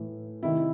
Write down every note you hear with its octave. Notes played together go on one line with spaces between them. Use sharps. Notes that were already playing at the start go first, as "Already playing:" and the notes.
Already playing: A2 E3
C3 D#3 E4